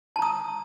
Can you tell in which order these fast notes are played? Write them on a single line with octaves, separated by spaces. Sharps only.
A5 A#5 D#6